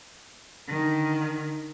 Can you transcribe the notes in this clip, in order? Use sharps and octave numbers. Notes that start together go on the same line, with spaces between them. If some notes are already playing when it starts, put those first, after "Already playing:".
D3 D#3